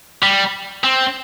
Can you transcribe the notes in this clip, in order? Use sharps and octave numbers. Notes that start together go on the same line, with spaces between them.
G3
C4